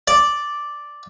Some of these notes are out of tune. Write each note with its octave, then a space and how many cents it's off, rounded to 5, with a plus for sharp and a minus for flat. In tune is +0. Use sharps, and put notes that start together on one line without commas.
D5 +0